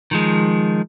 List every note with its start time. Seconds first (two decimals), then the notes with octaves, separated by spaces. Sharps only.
0.11 D#3 F3 G#3